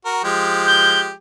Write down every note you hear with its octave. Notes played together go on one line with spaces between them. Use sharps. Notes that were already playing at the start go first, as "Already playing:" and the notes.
F#4 A#4
F3 G#3 G4
G6